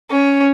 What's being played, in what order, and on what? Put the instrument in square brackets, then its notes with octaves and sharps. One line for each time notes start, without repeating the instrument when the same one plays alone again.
[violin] C#4